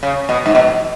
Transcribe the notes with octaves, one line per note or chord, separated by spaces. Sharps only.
C#3
B2
G#2
B2